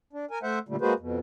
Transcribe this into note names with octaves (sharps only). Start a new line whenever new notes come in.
D4
A#4 G#5
A3 C5 E5 F#5
A#2 D3 G3 A3
G#3 A#3 F#4 G#4 B4 C5
F2 B2